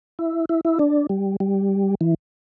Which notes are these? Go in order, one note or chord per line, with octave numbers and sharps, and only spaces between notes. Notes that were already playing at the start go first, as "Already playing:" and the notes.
E4
E4
E4
D4
G3
G3
E3